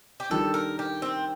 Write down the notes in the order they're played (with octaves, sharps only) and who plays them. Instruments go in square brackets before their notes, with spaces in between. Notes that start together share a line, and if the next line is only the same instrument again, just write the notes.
[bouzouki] G4
[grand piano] D#3 G3 D4 [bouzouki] A4
[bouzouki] A#4
G4
C4